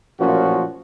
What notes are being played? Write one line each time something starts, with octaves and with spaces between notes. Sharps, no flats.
A1 F#2 A#2 F3 C#4 F#4